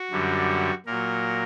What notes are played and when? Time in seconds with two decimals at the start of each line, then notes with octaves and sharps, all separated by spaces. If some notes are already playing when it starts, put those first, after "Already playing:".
Already playing: F#4
0.11 F#2 D3 G3
0.86 A#2 F#3 A#4